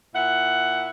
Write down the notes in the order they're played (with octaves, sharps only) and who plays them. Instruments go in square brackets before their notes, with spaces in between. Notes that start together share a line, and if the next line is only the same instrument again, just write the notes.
[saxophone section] A#2 E4 F#5